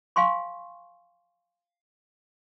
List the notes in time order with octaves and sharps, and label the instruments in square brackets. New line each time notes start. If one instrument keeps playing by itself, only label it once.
[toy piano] F5 G#5 C6 C#6